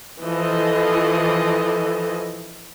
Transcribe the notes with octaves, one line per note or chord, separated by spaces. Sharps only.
E3 F3 A4 D#5